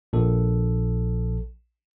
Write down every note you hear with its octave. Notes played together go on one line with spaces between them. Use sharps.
A#1 A4